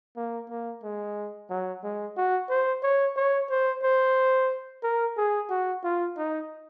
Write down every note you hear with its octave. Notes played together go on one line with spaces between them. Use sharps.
A#3
A#3
G#3
F#3
G#3
F#4
C5
C#5
C#5
C5
C5
A#4
G#4
F#4
F4
D#4